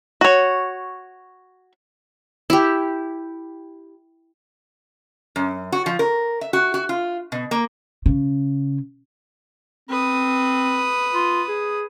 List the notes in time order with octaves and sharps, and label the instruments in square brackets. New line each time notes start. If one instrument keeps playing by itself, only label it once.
[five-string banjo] F#4 C#5
[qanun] E4 G4
[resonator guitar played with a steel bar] F#2
F#4
F3
A#4
E5
F#4
F#4
F4
B2
A#3
[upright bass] C#3
[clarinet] C4 [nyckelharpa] B4 D#6
[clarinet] F4
G#4